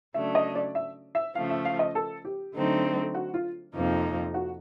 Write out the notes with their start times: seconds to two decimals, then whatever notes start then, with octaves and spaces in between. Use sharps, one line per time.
0.14 C#3 F#3 A3 D4 E5
0.35 D#5
0.55 D5
0.75 E5
1.15 E5
1.35 C#3 F3 A3 F5
1.50 E5
1.65 F5
1.79 D#5
1.95 A4
2.25 G4
2.54 D3 F#3 A3 C4 D#4
3.15 F#4
3.34 F4
3.74 F2 C3 F3 A#3 D#4
4.34 F#4